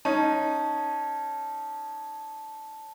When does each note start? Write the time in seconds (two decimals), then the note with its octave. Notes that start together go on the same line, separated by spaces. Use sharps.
0.05 C#4 D#4 A5